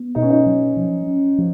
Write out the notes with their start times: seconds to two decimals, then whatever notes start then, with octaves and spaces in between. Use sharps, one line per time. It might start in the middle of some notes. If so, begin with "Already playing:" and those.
Already playing: B3
0.15 B2 D#4
0.22 C#4
0.30 D#4
0.46 F#3
0.77 F3
1.07 C#4
1.38 F3